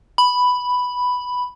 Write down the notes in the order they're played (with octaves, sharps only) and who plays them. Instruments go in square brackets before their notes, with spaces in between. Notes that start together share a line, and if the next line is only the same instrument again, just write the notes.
[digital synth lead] B5